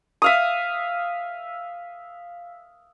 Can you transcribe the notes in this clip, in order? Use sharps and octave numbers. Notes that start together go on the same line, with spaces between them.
E5 F5 D#6